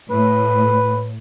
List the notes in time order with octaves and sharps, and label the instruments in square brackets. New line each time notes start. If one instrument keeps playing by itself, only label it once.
[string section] A2 [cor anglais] B4